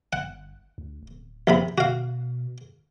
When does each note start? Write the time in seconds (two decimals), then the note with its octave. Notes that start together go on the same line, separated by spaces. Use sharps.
0.13 G1 F#5
0.78 D2
1.03 D1
1.47 A#1 C3 B5
1.78 B2 F#4 F5